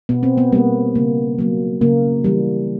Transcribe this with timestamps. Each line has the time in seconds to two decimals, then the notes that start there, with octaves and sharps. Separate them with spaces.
0.09 B2 B3
0.23 C4
0.38 B3
0.52 G3 A#3 B3
0.95 C#3 A#3
1.39 F#3 A#3
1.81 C#3 A#3
2.24 E3 G3